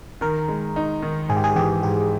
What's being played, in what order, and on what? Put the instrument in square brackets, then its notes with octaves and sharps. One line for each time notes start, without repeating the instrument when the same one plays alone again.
[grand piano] D#3 [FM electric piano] A#4
[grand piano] G#3
D#4
D#3
[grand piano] G#2 [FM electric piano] G#4
[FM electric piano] G4
G#4
[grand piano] E3 [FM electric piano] G4
[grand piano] G#2 [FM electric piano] G4